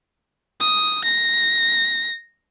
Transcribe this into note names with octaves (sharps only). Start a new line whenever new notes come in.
D#6
A#6